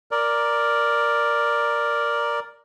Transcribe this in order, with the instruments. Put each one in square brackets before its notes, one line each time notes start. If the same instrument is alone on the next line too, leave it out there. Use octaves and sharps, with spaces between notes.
[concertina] A#4 D5